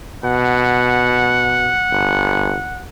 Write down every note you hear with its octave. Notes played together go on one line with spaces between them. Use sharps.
B2 F#5
G1